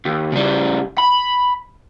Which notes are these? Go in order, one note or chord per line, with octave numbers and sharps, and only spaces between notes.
D#2
C#3 G3
B5